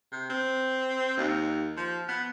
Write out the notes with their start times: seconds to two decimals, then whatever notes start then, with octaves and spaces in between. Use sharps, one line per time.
0.12 C3
0.30 C4
1.17 D#2
1.77 F3
2.09 B3